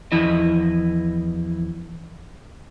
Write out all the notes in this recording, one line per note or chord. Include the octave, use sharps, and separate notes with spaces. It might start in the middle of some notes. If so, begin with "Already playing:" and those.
E2 F3 E4 D#5